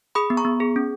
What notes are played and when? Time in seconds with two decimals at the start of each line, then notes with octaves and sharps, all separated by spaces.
0.15 G#4 B5 D#6
0.30 B3
0.37 A#5 C#6
0.45 B3
0.60 G#4
0.76 C#4